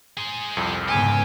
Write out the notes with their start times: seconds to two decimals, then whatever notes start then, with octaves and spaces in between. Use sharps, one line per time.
0.17 G#4 C5
0.57 C2 F2
0.88 G#2 C#3 B3 G4 G#5